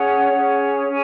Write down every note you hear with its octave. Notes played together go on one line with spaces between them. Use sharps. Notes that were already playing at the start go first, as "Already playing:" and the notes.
Already playing: C#4 G#4 C#5 F#5
C#4 G#4 C#5
C#4 G#5